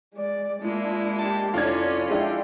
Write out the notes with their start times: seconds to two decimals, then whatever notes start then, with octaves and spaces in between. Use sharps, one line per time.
0.14 G#3 D5
0.62 G#3 A#3 D4 E4 F4
1.19 D4 G4 A5
1.54 F1 F2 C#4 D4 E4 F4 C#5 G#6
2.09 G#3 D4 E4 G5